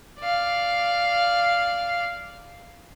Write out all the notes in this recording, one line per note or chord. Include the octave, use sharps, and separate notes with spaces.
D5 F5